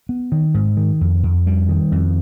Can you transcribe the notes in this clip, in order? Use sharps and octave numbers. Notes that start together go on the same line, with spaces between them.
B3
D#3
G#2
D#3
F2
F2
G3
D#3
F2